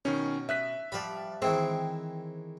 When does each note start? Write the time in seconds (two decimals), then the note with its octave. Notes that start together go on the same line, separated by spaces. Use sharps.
0.05 B2 D#3 C#4
0.49 D#5 E5 F#6 B6
0.92 F3 G3 D5 B5
1.42 D#3 E3 G#3 C4